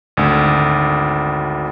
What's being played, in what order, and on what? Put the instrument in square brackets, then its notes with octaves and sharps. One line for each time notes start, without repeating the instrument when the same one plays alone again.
[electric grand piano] G#1 D2